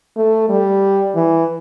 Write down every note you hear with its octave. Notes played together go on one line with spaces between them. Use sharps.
A3
G3
E3